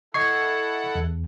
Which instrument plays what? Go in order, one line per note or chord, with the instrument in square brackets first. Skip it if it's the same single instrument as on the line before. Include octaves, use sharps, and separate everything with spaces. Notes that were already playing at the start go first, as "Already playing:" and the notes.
[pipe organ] E4 A4 F#5 [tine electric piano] D#5 G#6 C7 [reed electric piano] C#6
[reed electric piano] E2